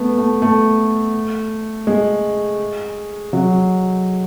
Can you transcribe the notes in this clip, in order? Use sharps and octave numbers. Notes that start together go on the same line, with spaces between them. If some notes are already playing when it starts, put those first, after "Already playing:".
Already playing: A3 B3
A3
A3
G#3
F#3